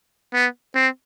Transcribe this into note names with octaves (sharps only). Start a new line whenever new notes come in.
B3
C4